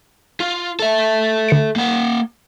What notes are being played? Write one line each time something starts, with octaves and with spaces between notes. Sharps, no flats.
F4
A4 E5
D3 C#7 D7
A#3 F#5